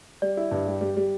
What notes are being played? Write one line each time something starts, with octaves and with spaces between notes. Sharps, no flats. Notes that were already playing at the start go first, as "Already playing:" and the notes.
G3 D5
E4
G2
G3
G3
G3